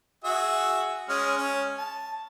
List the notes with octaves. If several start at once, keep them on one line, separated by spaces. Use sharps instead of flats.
F#4 G#4 E5
G#3 C#4 F6
C#4
A5